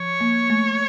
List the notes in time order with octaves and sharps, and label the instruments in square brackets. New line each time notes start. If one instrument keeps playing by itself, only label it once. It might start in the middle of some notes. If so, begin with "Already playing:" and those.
Already playing: [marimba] F3 [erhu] C#5
[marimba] A#3
A3